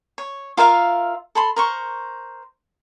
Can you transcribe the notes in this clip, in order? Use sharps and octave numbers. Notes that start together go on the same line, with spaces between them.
C#5
F4 A#4 E5 F5
A4 B5 C6
A#4 C5 C#6